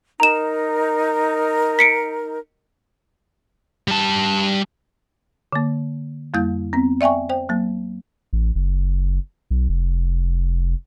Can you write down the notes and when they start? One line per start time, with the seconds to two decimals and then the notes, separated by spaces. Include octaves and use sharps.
0.20 D#4 A#4 A#5 E7
1.79 B6 C#7 D7
3.88 G3 A5
5.53 D3 A#3
6.34 F2 G3 A#3 E4 G6
6.73 B3 C4
7.01 D5 E5 G5 G#5 C#6
7.29 C5 G5
7.49 F#3 A#3
8.33 A1
8.55 F#1
9.51 B1
9.69 F1